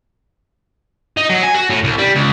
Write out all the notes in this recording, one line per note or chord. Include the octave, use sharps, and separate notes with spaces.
D#4
F#3
G#5
F#4
A2
C2
G3
C#2